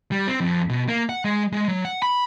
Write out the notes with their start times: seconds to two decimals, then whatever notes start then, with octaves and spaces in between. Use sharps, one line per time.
0.12 G3
0.28 C4
0.41 F2
0.70 B2
0.89 A#3
1.09 F#5
1.25 G#3
1.52 G#3
1.68 F#3
1.85 F#5
2.02 B5